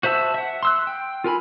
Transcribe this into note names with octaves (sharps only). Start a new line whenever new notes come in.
F#4 C5 E5 A5 E6
E5 F#5
C6 E6 F#6
G5
F4 A#4 G#5 B5